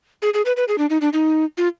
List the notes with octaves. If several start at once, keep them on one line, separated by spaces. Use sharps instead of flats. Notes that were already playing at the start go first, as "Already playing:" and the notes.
G#4
G#4
B4
B4
G#4
D4
D#4
D4
D#4
F4